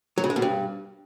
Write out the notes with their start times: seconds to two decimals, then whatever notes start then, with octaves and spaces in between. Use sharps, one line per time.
0.18 F#3
0.24 C#3
0.30 G#3
0.36 B2
0.42 G2